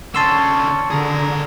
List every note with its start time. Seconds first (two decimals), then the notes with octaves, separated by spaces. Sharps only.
0.15 D3 C#4 A5 C6 C#6 E6
0.91 D3 G#4 A#4 A#5